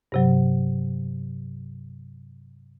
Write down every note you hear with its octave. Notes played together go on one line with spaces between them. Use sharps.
G2 C3 F#3